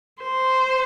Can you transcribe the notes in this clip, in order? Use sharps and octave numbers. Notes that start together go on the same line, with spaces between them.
C5